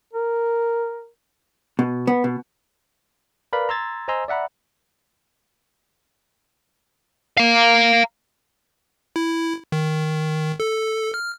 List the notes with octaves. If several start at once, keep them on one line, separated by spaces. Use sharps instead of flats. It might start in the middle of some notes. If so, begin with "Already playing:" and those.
A#4
B2
B3
B2
A#4 B4 D5 F5 B5
A#5 C6 E6 G#6 A6
C5 D#5 G#5 A#5 C6 E6
D5 E5 F#5 A#5 B5
F5 A#5
E4
D#3
A4
F6